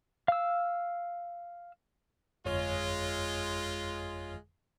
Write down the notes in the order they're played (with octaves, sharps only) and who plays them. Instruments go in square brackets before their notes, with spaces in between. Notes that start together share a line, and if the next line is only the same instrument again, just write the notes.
[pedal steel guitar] F5 E6
[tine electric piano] G1 F2 C#5 [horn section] G#3 F4